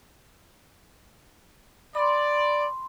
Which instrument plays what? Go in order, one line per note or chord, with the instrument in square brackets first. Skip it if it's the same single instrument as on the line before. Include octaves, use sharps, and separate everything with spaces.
[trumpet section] D5 [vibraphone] B5 C6